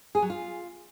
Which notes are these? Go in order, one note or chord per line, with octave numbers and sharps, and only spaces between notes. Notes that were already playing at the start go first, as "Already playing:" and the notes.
G#4
F#3
F4